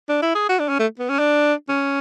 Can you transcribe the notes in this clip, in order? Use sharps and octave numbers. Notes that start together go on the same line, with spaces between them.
D4
E4
G#4
F#4
D4
C#4
A3
B3
C#4
D4
C#4